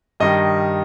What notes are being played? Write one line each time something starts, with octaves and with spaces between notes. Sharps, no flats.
G2 D#3 G3 D#5